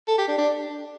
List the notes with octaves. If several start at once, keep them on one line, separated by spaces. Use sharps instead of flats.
A4
G4
D4
D4